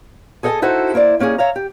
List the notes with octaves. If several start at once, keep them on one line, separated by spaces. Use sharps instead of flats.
G#4 A4 D#5 F#5 G#5 A5
D#4 E4 F#4 A4 C5
A#3 E4 C5 D5
G3 A#3 C#4 D#4 G#4
C#5 E5 F5 A#5
G4